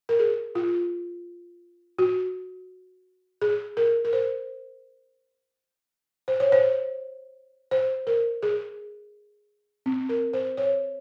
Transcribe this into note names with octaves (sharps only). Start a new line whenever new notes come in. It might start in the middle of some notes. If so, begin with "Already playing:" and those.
A#4
G#4
F4
F#4
G#4
A#4
A#4
C5
C5
C#5
C5
C5
A#4
G#4
C4
A#4
C5
C#5